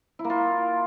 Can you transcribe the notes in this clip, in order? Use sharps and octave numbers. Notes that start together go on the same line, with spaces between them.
E4
A#3
F4